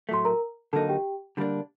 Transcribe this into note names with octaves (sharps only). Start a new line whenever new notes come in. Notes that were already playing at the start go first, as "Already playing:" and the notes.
A2 F#3 A3 C6
A#4 A#5
D3 F#3 A#3 D#4 A4 A5
G4 G5
D3 G3 A#3 D4